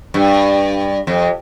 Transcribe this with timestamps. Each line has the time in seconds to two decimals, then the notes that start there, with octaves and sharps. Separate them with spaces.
0.14 G2
1.07 F2